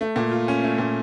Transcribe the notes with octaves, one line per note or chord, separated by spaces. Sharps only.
A3
A#2
F4
C#4
A3
A#2